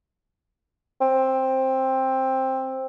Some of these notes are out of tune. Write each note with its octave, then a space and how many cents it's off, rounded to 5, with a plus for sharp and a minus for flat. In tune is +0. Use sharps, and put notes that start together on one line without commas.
C4 +10